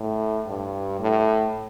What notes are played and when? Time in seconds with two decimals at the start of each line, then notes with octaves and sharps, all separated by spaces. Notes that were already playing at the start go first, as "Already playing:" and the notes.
Already playing: A2
0.47 G2
1.00 A2